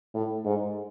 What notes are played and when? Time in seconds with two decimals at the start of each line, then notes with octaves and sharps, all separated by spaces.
0.14 A2
0.45 G#2